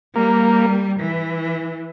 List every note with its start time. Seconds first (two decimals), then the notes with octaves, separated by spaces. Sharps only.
0.15 G3 A#3
0.99 E3